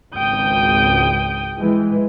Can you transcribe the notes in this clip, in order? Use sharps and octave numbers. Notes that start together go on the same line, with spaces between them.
G#1 C#2 G5 D#6 G6
E3 G#3